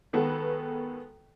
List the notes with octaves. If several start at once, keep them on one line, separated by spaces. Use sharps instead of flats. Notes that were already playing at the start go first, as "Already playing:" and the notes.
D#3 G#3 B3 F#4 A4 B4